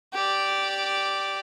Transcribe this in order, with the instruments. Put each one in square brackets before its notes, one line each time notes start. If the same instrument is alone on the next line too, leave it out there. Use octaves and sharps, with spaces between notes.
[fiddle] G4 D5